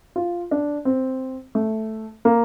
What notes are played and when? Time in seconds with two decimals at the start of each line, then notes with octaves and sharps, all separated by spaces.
0.16 F4
0.51 D4
0.85 C4
1.55 A3
2.25 A#3